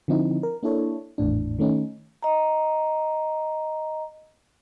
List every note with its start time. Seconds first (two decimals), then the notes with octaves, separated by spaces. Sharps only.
0.08 D3 F3 C4 D#4 E4
0.43 A#4
0.63 A#3 D4 E4 A4 C#5
1.18 G#1 E2 A2 D4
1.59 D#3 A3 C#4 D#4
2.23 D#5 A#5